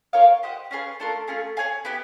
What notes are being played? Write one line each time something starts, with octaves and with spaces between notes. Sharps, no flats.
F4 A#4 C#5 F5
G4 C5 D#5 F#5
C#4 F4 G#4 B4
A3 D4 F4 A#4
A3 C#4 F4 G#4
G#4 C#5 F5 G#5
B3 E4 G4